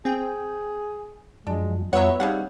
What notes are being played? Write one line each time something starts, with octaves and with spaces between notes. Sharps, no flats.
C4 G#4 G5
F#2 F3 F#3 G#3 D4
F2 F#3 G3 B3 F4 C#5 E5 F#5
G3 C4 D#4 G#4 F5 F#5